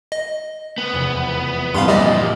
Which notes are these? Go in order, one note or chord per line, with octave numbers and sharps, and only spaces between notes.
D#5
B3
F1 E2
C2 G2 F5 B5 C6
F2 A#2 G3 G4 D5 D#5